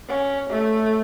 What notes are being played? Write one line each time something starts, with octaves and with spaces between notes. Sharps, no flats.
C#4
A3